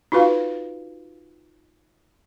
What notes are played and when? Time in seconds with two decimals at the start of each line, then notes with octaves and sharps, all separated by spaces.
0.12 D#4 F4 F#4 B4 F5